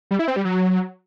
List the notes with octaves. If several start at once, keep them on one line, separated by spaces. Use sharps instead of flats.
G3
E4
C4
G3
F#3